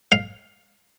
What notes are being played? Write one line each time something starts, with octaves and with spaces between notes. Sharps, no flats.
F5